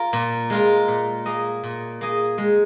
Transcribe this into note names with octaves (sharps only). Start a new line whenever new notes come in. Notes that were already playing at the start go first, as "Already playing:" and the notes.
Already playing: F4 A#4
A#2
G#3 F4 A#4
A#2
A#3 G#4 D#5
A#2
A#3 G#4 D#5
G#3